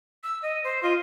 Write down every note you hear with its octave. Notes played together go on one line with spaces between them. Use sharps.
E6
D#5
C5
F4 D#5